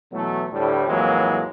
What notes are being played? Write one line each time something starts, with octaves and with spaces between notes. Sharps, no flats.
B2 E3 F#3 A3
D2 A2 G3
F2 A2 E3 F#3 G#3 A#3